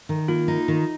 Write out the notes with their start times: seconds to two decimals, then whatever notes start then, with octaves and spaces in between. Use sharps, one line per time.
0.09 D#3
0.28 A#3 F4
0.48 D#4
0.68 D#3